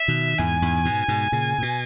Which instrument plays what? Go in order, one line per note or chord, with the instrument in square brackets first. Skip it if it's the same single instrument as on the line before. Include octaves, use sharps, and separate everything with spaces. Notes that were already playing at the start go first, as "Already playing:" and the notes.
Already playing: [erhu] E5
[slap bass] B2 D#3
[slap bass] E2 G#2 [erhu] G#5
[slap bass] E2 G#2
G#2 B2
G#2 B2
A#2 C#3
A#2
B2